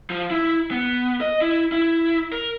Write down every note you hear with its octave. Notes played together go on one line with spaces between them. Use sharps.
F3
E4
B3
D#5
E4
E4
A#4